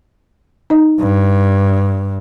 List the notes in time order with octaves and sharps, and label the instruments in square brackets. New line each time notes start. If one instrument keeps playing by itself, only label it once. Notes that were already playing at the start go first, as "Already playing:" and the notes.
[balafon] D#4 D#5
[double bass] G2